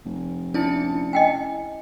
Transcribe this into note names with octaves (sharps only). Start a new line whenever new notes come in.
F1
C#4 D4 E4 A5 C#7
D#5 G5 G#5